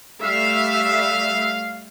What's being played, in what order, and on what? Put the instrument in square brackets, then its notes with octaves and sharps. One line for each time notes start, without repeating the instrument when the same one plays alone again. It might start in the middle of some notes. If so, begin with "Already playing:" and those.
[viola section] G3 A3 E5 [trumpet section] F5